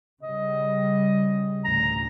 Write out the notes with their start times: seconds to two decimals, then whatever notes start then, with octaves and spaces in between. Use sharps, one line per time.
0.23 C#3 G3 D#5
1.65 A1 D2 A#5